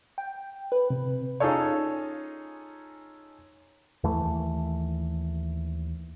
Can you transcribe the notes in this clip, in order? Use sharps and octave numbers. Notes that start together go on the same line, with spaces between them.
G5
B4
C3
C#4 D#4 F4 G#4 A4 C#5
D#2 E3 A3